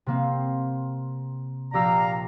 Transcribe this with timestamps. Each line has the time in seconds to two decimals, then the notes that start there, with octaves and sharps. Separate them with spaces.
0.06 C3 A#3 C4
1.74 A#1 G4 D5 F5 A#5 E6